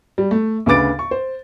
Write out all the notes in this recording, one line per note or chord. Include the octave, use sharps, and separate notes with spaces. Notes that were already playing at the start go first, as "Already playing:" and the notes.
G3
A3
D2 C#3 B4 D6 A6 D7
C#6
C5